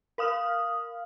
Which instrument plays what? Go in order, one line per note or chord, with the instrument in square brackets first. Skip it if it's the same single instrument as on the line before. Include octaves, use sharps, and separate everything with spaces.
[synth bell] A#4 F5 D#6 F6